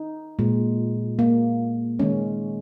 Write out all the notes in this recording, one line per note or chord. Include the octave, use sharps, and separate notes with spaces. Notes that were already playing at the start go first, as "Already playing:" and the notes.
Already playing: D#4
A#2 G#3
A#3
D#3 G#3 C#4